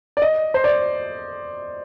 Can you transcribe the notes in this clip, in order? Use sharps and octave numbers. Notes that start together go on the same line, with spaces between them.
D5
D#5
C5
D5